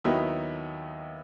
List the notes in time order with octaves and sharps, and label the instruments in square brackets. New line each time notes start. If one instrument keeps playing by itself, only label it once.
[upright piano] D#2 D#3 F#3 B3 D#4 E4 E5